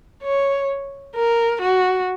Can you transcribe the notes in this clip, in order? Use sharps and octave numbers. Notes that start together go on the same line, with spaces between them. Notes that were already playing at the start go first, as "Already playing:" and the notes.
C#5
A#4
F#4